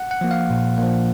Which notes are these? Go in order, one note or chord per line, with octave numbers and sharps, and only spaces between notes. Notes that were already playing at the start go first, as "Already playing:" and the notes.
Already playing: F#5
F#5
F3 A#3
F5
A#2
A#3
F3